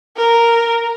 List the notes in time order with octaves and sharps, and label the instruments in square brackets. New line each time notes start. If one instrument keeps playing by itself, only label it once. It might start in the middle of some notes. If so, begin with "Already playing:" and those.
[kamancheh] A#4